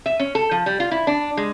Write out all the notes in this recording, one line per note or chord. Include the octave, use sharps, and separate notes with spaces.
E5
C#4
A4
F3
G3
F4
E4
D4
G#3